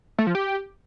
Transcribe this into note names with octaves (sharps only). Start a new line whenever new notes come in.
A3
F3
G4